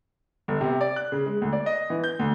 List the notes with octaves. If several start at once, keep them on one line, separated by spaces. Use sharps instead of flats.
G1
C3
D5
F#6
C#3
G#3
D2
D5
D#5
E3
G6
D2